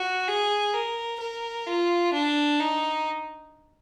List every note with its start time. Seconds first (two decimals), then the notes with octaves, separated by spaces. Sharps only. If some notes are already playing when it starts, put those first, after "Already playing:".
Already playing: F#4
0.28 G#4
0.74 A#4
1.21 A#4
1.67 F4
2.13 D4
2.60 D#4